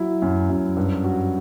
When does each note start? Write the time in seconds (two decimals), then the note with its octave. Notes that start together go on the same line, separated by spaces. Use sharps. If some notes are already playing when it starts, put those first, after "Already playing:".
Already playing: F#3 E4
0.22 F#2
0.50 F#2
0.76 G2
1.04 F#4